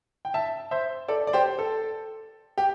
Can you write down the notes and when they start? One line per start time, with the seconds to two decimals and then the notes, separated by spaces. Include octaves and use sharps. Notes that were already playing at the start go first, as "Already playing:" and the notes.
0.25 G5
0.34 E5 A5
0.71 C5 E5
1.08 A4 D5
1.27 D5
1.33 G4 C5
1.59 A4
2.58 G4